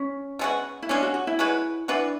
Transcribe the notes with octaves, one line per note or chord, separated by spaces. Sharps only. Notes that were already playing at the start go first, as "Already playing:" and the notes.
Already playing: C#4
B2 G#3 B3 F#4
E4
C#3 G#3 C#4 D4
F#4
F#4
E4
G#3 C#4 F#4 B4
E3 B3 D4 F#4 B4